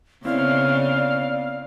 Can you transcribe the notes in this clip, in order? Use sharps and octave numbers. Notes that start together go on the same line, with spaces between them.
C#3 B3 C4 E4 D5 F5